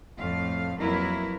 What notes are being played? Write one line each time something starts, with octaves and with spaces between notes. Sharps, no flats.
F2 A2 A3 F5
F2 F#3 A#3 E4 A#4 B4